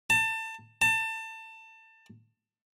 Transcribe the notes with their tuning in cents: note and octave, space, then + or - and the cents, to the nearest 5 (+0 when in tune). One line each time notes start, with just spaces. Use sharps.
A5 +25
A5 +25